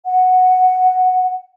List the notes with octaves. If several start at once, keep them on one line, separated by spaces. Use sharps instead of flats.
F#5